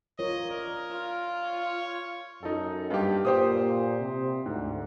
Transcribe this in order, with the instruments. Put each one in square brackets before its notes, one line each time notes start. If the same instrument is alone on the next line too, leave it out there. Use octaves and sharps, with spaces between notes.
[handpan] F4 A#4 C#5 [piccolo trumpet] D#5
[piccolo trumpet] A#4 [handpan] D5
[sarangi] F4
[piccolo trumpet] C#5
[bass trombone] F#2 [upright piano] D#4 A4
[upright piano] G2 G4
[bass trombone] A#2 [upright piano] G4 C5 D#6
[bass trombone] C3
[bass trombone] D2 [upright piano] G#2